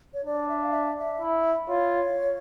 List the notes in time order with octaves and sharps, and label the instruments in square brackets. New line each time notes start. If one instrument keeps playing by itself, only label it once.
[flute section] C#5
[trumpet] D4 [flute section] D5
[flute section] E5
F5
E5
E5
[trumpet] E4
[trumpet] F4 [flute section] C#5